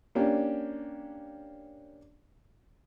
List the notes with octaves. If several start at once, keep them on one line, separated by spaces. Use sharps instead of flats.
A#3 C#4 D4 G4